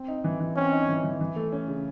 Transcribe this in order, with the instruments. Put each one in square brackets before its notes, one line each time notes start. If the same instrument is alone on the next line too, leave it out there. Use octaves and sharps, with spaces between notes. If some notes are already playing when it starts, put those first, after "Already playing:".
Already playing: [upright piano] C4
D#4
E3
E3
[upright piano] C4 [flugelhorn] C#4
[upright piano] D#4
E3
E3
E3
A3
C#4
C#3